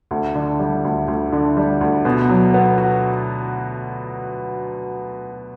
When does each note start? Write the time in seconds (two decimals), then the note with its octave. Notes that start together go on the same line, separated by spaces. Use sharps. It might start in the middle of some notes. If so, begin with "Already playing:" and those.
0.11 D2
0.35 D3
0.60 G3
0.85 D2
1.08 D2
1.33 D3
1.57 G3
1.81 D2
2.05 B2
2.30 F#3
2.54 B3
2.78 F#4